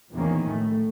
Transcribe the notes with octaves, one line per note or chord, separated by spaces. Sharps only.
A#1 E2 D#3 A#3 C#4
A2 A3